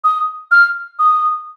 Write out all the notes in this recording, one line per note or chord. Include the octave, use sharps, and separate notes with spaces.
D#6
F6
D#6